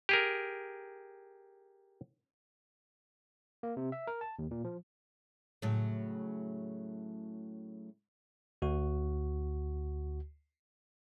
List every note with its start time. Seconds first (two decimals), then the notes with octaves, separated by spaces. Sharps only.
0.09 G4 G#4 A#4
3.63 A#3
3.77 C3
3.92 E5
4.07 A#4
4.21 A5
4.39 D#2
4.51 A#2
4.64 F3
5.62 A2 C#3 F#3
8.62 D2 F#4